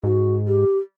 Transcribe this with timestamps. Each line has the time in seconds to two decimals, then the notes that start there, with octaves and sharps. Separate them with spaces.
0.04 G#2 F#4
0.47 G4